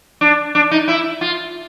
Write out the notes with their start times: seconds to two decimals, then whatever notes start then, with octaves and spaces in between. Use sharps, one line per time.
0.21 D4
0.55 D4
0.71 D#4
0.88 E4
1.21 F4